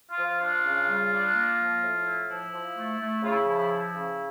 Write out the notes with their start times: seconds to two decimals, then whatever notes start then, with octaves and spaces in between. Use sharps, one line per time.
0.10 F4
0.17 F3
0.40 D4 F4
0.65 C#3
0.87 G3
1.11 D4
1.34 A#3
1.58 F3
1.81 A2
2.06 E4
2.29 F3 E4
2.52 F3
2.76 A3
2.99 A3
3.23 C#3 F4
3.31 E4
3.46 F3 E4
3.70 E4
3.94 C#3